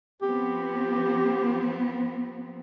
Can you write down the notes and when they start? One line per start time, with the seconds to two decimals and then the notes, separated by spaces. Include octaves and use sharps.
0.22 F3 B3 C4 G4